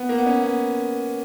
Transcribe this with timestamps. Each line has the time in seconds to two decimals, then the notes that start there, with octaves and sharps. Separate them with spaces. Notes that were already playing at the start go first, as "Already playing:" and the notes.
Already playing: B3
0.09 A#3
0.18 B3
0.26 C#4
0.43 B3